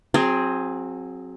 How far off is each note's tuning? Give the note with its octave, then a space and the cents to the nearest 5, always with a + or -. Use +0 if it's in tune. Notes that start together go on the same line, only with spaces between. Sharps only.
F#3 -25 C4 +15 G#4 +0